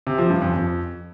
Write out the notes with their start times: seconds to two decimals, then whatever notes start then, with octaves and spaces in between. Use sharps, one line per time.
0.07 C3
0.18 F3
0.30 G2
0.42 F2
0.53 F2